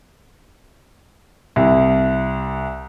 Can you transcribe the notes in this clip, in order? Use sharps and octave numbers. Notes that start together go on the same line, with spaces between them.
C2